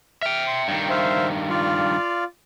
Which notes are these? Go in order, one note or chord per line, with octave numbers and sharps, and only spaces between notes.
E5 G5 F6
C6
G2 D#3 G5
C5 E5 F5
F4 D5 F5